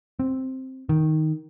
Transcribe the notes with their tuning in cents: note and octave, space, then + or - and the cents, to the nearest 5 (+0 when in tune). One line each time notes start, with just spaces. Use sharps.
C4 +5
D#3 +5